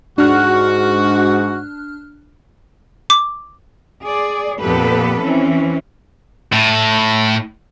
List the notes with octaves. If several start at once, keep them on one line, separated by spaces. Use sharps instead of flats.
G#2 D4 F#4 F6 F#6
D6
G#4 D5
F2 A#2 B3 G4 A4 B4
E3 C4 C#4
A2